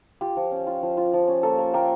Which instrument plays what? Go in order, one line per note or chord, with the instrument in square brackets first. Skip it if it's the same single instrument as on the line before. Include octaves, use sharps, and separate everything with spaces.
[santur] F4 G4
F3
C#4
F4
F3
F4
F3
C#4
A#3 A4
A#3
A#3 G5